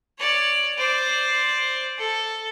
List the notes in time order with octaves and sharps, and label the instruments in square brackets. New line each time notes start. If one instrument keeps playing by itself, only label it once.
[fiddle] C#5 D5
C5 D5
A4